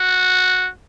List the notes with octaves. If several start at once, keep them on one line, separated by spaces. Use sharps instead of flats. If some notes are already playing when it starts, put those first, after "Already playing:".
Already playing: F#4